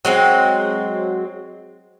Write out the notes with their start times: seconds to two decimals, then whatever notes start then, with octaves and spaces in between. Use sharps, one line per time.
0.05 F#3 G#3 C4